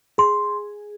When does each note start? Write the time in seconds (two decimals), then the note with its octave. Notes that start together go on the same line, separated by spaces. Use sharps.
0.18 G#4 C6